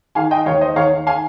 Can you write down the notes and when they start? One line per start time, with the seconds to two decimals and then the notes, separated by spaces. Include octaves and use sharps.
0.15 D#3 F5 G#5
0.31 D#5 G5
0.46 D#2 C#5 F5
0.61 C5 D#5
0.76 D#3 C#5 F5
1.07 F5 G#5